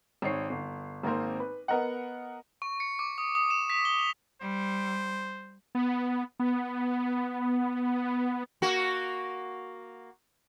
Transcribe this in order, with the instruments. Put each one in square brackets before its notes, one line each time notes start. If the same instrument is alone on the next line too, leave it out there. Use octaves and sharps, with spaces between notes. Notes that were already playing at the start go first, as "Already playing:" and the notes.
[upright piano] G#1 C#5 C7
G1
G#1 A#3 C4 A#4 C5
B4
B3 A#4 D#5 F#5
[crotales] C#6
C#7
D6
D#6
D#6
E7
B6
G7
F7
[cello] G3 [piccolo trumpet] C5
[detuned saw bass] B3
B3
[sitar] A#3 F#4